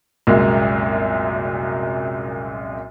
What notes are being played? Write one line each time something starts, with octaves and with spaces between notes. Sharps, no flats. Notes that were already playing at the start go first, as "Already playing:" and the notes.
C2 F#2 A#2 G#3 A#3